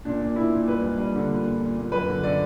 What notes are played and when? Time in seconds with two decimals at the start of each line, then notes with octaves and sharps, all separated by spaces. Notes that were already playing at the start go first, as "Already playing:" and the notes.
0.05 A#2 D4
0.21 A#2
0.36 A#2 E4
0.51 A#2
0.68 G2 B4
0.83 G2
0.98 G2
1.15 D3
1.30 A#2
1.46 A#2
1.61 A#2
1.77 A#2
1.92 F#2 B4
2.08 D3
2.23 D3 D5